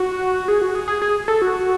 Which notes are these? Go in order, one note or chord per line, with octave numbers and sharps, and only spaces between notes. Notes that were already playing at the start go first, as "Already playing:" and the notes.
Already playing: F#4
G#4
F#4
G#4
G#4
G#4
A4
F#4